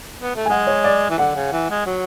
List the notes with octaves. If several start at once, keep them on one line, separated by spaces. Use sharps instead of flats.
B3
A3
G#5
G#3 F#5
C#5
D5
E3
D3 F#5
C#3
E3
G#3
F#3